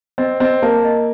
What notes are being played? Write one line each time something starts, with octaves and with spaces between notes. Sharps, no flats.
C4 D#5
C4 D#5
A#3 A5
D#5